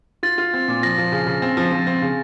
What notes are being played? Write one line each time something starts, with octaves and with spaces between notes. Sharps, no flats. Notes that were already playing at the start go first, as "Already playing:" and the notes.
F4 A6
F4
C4
A#2
F3 A#6
F3
C#3
C#3
C4
F3
F3
C4
C#3